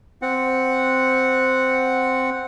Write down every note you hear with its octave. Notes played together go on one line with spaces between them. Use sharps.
C4 F#5